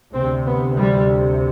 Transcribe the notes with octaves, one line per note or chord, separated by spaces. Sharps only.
D2 C3 C4
B3
G3